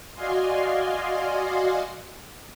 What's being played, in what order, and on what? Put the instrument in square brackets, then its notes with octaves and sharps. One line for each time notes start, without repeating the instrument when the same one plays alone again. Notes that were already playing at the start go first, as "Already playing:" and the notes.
[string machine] F#4 D5 D#5 F5 G#5 C6